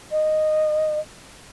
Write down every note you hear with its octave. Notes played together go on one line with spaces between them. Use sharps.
D#5